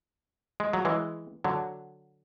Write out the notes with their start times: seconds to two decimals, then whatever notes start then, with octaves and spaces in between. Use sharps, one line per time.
0.60 G#3
0.73 F#3
0.85 E3 G#3
1.44 D3 F#3